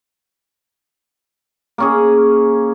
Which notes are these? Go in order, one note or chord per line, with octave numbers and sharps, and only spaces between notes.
A#3 C#4 G#4